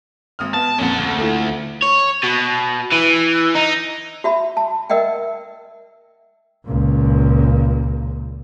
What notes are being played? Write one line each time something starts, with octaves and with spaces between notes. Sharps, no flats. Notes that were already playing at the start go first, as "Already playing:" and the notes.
G#1 D#6 F6
B3 A5
A#1 F2 C#4 F#5
D2
A3 E4 F4
C#5
B2
E3
D#4
F#4 E5 B5
A5
A#4 D#5 E5 F#5 G5
C#2 A#2